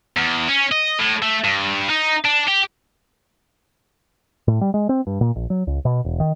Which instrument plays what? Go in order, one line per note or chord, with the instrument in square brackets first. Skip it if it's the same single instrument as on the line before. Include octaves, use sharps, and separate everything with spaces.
[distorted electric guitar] E2
C#4
D#5
A2
A3
G2
D#4
D4
G4
[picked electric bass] A2
G3
G#3
C4
G2
A#2
A#1
F#3
C#2
B2
E1
D#3